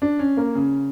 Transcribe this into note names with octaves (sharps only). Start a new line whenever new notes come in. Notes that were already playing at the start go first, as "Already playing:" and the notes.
D4
C#4
A#3
C#3